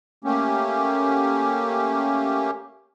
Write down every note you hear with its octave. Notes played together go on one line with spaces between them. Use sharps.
A3 A#3 C#4 G4